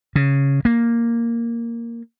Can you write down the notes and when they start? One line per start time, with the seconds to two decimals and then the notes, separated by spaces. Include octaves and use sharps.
0.16 C#3
0.65 A#3